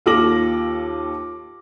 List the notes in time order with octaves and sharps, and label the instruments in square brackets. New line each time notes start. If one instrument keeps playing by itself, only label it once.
[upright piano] D#2 F4 A4 D6 A#6 F#7